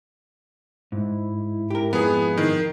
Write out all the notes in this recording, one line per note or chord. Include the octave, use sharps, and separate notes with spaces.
G#2 E4
G4 A#4
F2 B3 G#4
D#3 C7